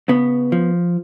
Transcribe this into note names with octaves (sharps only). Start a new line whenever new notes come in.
C#3 B3
F3